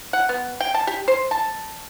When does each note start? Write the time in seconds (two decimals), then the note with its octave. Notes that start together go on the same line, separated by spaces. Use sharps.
0.13 F#5
0.29 B3
0.60 G5
0.74 A5
0.87 G4
1.08 C5
1.31 A5